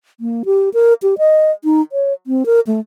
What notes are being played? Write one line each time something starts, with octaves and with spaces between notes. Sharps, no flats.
A#3
G4
A#4
G4
D#5
D#4
C#5
C4
A#4
A3